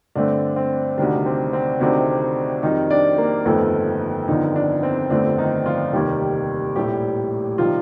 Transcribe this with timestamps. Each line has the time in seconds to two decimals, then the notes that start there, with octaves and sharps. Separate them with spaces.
0.15 G2 D3 A3 C4 D4
0.56 C4
0.98 D2 C3 D#3 G3 D4
1.26 C4
1.53 C4
1.80 D2 C3 D#3 A3 C4 D4
2.63 F2 D#3 G3 C4 D#4
2.91 D4 D5
3.18 A#3 A#4
3.45 G1 F2 D#3 A3 C4 A4
4.28 G1 F2 D3 D#3 F3 D#4
4.56 D4
4.83 C4
5.10 G1 F2 D3 A3 C4 D4
5.38 D#3 D#4
5.66 F3 F4
5.93 F1 D#2 D#3 G3 G4
6.76 A#1 A2 G3 A3 G4
7.58 C3 D#3 F3 G3 F4